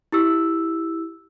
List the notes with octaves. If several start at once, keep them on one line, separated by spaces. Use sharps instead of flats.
E4 G4 E6